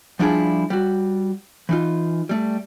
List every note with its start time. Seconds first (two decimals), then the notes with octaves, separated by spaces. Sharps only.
0.19 F3 G3 D4 E4 F4 G#4
0.70 G3 F#4
1.69 E3 D#4 F4
2.29 G3 A3